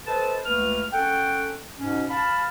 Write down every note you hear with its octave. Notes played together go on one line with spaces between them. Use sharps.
A4 B4 C5 D#5 A5
C#2 A3 A#3 B4 F6
C#4 A4 F#5 G5
G#2 B2 C#4
F5 A5 B5